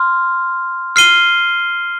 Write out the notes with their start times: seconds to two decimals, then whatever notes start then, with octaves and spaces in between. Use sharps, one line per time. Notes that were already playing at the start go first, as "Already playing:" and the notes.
Already playing: C6 F6
0.96 F6 C7 D#7 G7